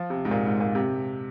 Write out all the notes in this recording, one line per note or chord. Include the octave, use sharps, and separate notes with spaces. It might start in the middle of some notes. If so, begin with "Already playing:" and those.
Already playing: F3
C3
G#2
A#2
G#2
A#2
C3